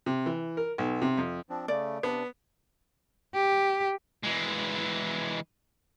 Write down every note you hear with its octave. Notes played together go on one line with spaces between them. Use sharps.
C3
E3
A#4
B1
C3
F2
F3 C4 D4
C#3 A3 D5
C3 B3 D4
G4
E3 G#3